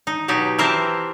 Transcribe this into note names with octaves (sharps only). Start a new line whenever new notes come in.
D#4
B2 F#3 D#4 G4
E3 C4 A#4 C5 E5 A5